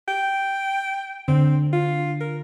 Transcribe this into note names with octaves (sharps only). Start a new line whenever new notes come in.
G5
D3 C4
F4
A#4